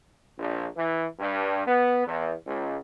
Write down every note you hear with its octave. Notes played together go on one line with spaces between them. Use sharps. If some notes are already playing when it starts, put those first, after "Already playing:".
A#1
E3
G2
B3
E2
C#2